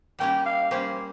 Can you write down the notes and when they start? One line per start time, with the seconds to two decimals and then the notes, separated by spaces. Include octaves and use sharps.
0.19 G3 A#3 C#4 G4 G5
0.45 F5
0.71 G3 A#3 C#4 G4 C5